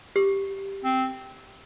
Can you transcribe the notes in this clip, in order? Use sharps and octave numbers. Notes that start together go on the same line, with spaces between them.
G4
C4